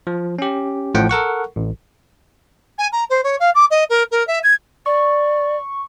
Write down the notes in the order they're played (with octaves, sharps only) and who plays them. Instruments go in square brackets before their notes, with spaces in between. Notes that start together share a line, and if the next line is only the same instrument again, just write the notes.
[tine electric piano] F3
C#4 G4
A1 A2 F3 F#5 G5
A4 A#4 F#5 C#6
A1
[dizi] G#5
A#5
C5
C#5
F5
D6
D#5
A#4
A#4
E5
G#6
[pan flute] D5 [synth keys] C#6